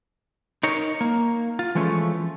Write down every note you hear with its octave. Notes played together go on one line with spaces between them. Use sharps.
D#4 A#4 C#5
A#3
F4
E3 F3 G#3 A3 C#4